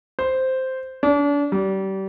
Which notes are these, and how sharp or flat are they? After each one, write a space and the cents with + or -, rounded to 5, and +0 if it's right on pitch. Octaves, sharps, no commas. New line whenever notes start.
C5 -5
D4 -35
G3 -30